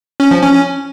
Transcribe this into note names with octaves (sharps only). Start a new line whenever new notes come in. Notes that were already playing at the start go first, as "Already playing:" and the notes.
C#4
F3
C#4